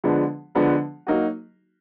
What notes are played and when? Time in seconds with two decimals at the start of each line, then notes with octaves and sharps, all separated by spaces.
0.04 D3 F3 G#3 B3 D4
0.55 D3 F3 G#3 B3 D4
1.07 F#3 A#3 D#4 F#4